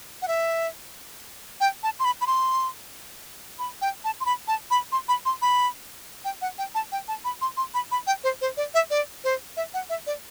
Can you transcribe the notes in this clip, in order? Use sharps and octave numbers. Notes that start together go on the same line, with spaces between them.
F#5
E5
G5
A5
C6
B5
B5
C6
B5
G5
A5
C6
B5
A5
B5
C6
B5
C6
B5
G5
F#5
G5
A5
G5
A5
B5
C6
C6
B5
B5
G5
C5
C5
D5
E5
D5
C5
E5
F#5
E5
D5